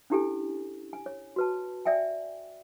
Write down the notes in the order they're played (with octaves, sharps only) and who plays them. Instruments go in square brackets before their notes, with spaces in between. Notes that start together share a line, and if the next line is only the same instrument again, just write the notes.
[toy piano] C#4 D4 E4 G4 A4 G#5
G#5
C#5
F#4 B4 A5
D5 E5 G5 G#5